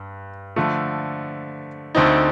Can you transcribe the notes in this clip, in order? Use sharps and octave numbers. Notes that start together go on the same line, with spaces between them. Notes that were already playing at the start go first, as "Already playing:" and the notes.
Already playing: G2
D3 F3 A3
D2 D3 A3 C4 D#4